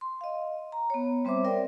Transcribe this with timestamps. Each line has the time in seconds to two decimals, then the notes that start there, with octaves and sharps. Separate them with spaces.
0.01 C6
0.21 D#5 F5
0.72 A#5
0.90 B3 C#5
1.25 G3 C4 C5 E5 D6
1.44 A#4 D5 E5 G5